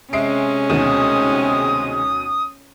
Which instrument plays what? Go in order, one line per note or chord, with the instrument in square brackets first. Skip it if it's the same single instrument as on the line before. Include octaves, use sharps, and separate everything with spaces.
[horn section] C3 G#3 [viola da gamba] C#4 [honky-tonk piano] E5 C7 D7
[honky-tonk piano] D2 B2 D#3 [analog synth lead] D#6